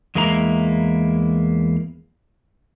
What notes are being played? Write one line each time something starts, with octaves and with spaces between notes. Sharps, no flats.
E2 G#3 A#3 E4 A#5